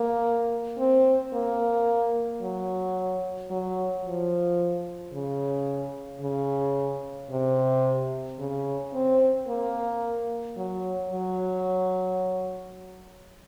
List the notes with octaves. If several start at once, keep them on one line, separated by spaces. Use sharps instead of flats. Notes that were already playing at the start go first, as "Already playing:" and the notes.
Already playing: A#3
C4
A#3
F#3
F#3
F3
C#3
C#3
C3
C#3
C4
A#3
F#3
F#3